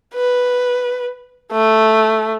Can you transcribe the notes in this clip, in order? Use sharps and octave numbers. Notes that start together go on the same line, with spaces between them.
B4
A3